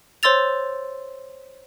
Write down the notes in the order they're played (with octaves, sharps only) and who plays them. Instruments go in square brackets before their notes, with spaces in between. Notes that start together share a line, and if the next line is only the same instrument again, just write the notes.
[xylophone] C5 C#5 C6 E6 A6 F7